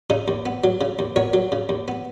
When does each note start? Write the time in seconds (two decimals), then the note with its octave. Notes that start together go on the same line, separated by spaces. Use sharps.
0.10 C#3 D#4
0.28 D#2
0.46 B3
0.64 F#3
0.81 C#3
0.99 D#2
1.16 B3 A#4 C#5
1.33 F#3
1.52 C#3
1.69 D#2
1.88 B3